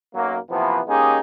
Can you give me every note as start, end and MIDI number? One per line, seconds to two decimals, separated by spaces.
0.15 0.36 35
0.15 0.36 42
0.15 0.36 54
0.15 0.36 58
0.50 0.79 48
0.50 0.79 52
0.50 0.79 53
0.50 0.79 58
0.50 0.79 59
0.87 1.18 56
0.87 1.18 58
0.87 1.18 61
0.87 1.18 63
0.87 1.18 67
0.87 1.18 68